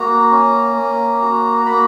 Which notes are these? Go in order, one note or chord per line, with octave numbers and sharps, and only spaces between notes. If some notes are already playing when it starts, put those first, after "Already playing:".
Already playing: A#3 F#4 A#5
C#4
A#3
F#4
A#3 B5